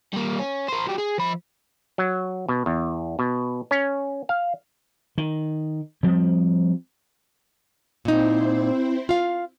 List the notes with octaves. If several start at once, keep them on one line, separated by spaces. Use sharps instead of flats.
G3 A#3
C#4
A#4 C5
F#3 G4
G#4
F3 B5
F#3
B2
E2
B2
C#4
F5
D#3
F3 G3 C4
A#2 C4 D#4 E4 C5
F4 F5